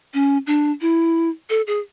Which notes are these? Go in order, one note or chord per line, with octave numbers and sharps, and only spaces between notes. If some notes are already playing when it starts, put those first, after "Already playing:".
C#4
D4
E4
A4
G#4